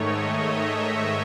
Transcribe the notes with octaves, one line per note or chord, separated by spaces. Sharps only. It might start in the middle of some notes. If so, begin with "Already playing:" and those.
Already playing: G#2 D#3 A3 C#5 D#5
E5